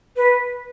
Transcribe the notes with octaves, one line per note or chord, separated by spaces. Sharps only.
B4